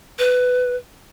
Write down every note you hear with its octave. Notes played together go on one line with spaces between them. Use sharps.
B4